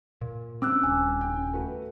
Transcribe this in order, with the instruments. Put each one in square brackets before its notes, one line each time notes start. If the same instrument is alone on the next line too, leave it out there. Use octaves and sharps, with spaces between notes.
[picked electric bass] A#2
[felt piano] G2 C#3 [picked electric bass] C4 [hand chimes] D6 E6 F#6
[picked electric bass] D#1 [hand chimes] G#5
[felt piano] C#3 G5
A3 F#4 B4